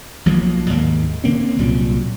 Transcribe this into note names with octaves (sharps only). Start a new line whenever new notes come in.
B1 F3 F#3 A#3
D#2 G#2 A#3
D3 A#3 C4 C#4
C2 A#2 F#3 G3